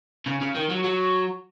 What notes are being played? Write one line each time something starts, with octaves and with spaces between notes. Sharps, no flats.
C#3
C#3
D#3
F#3
F#3